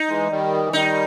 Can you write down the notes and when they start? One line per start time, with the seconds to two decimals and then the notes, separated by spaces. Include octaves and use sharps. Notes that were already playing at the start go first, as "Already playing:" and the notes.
Already playing: D#4
0.09 E3 G#3
0.30 D#3 G3
0.66 E3
0.73 D#3 G3 D#4